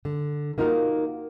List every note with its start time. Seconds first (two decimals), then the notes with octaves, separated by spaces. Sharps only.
0.05 D3
0.58 A#3 D#4 F4 F#4 A#4